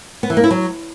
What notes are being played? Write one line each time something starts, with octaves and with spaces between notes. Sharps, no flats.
B3
E3
A#3
E4
F#3